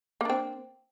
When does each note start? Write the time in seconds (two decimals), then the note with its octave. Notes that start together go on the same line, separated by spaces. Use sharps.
0.21 A#3
0.25 D4
0.30 C4